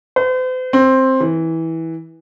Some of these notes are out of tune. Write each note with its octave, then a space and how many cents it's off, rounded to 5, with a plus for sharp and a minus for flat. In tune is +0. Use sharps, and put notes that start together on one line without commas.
C5 -45
C4 +10
E3 -15